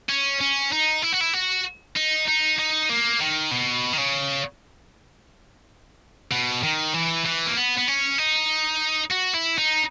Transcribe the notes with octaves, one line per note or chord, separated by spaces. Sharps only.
C#4
C#4
D#4
E4
F#4
E4
F#4
D#4
D#4
D#4
A#3
D#3
B2
D#3
C#3
B2
D#3
E3
E3
A#3
B3
B3
C#4
D#4
F#4
E4
D#4